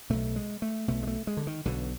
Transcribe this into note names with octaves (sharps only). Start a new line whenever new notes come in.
B1 B2 A3
G#3
A3
B1 B2 A3
G#3
A3
G#3
D3
D#3
B1 B2 D3